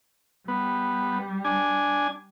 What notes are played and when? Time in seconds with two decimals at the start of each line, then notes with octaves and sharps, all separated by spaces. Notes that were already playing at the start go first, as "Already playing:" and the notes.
0.48 G3 B3
1.45 D4 G#5